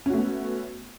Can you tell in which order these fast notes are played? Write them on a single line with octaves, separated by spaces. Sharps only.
C#4 F#4 A3 B3